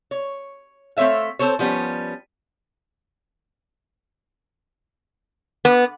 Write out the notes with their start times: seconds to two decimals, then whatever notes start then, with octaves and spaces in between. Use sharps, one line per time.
0.11 C#5
0.97 A3 C4 C#5 E5 F5
1.39 C4 A4 C5 C#5
1.59 F3 G3 B3 C#4
5.65 B3